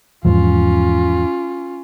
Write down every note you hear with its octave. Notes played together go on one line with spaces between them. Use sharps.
E2 G#2 F3 C#4 F4